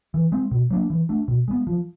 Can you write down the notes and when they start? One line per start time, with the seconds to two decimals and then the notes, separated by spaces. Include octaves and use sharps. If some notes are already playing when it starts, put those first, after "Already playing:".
0.14 E3
0.32 G#3 C4
0.51 B2
0.71 F#3 A#3 D4
0.90 E3
1.09 A3 D4
1.28 B2
1.48 G#3 B3
1.67 F3